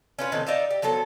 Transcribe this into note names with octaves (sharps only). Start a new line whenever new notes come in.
C#4 F4 B4
A2 C3 D#3 B3
D#4 D5 E5 F5
G4
F3 F#3 B3 A4